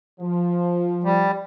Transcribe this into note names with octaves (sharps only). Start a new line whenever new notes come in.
F3
G3